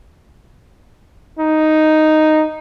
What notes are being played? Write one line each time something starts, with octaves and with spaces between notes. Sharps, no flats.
D#4